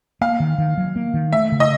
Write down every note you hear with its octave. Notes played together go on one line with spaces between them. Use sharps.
A#3 F5
D#3
D#3
F#3
A#3
D#3
A3 E5
C#3
D#5